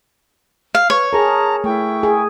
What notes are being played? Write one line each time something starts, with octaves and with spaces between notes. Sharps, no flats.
F5
B4 C#5
G#4 A#4 A5 A#5
A3 E4 G5 C#6
G#4